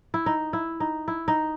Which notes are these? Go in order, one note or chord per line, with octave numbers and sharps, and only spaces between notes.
E4
D#4
E4
D#4
E4
D#4